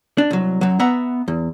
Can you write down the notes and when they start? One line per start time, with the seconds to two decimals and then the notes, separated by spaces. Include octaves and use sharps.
0.18 D4
0.31 C2 F#3
0.61 F#2 F#3
0.79 B3 E5 F#5 A#5
1.28 E2